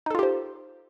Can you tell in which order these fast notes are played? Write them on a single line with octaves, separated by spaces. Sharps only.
D#4 A4 F4 G4 C5